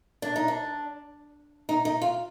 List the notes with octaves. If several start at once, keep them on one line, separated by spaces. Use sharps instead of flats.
D4
D#4
D4
D#4
D#4
F4